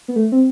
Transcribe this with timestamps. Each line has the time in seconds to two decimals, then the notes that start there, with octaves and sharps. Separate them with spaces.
0.08 B3
0.16 A3
0.32 C4